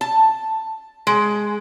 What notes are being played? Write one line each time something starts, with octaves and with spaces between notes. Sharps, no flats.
A5
G#3